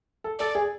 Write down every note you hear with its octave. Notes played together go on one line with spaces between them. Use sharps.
A4
A4 D5
G#4